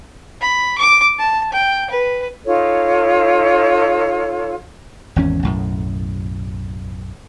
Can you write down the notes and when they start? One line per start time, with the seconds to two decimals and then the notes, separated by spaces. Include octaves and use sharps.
0.41 B5
0.78 D6
1.19 A5
1.53 G5
1.90 B4
2.46 D#4 F4 A4 C#5
5.16 G#1 E2 C#4
5.43 B1 F#2 A2